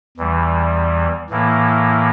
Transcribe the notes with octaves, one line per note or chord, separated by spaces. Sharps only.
E2 E3 G3
A2 E3 A#3 E4